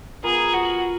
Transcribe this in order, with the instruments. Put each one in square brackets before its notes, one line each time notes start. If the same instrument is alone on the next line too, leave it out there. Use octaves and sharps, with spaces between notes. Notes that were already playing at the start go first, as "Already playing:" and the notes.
[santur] B3 F4 A#4 [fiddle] G#4
[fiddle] F#4